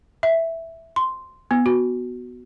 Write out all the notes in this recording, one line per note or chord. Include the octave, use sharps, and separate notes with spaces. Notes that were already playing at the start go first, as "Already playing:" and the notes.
E5
C6
B3
F#4